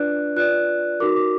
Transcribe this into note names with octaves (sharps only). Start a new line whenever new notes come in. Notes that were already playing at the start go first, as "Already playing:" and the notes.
Already playing: D4 F4 B4 D5 F#6
F4 B4 D5 F#6
D#4 F#4 A#4 D6
D6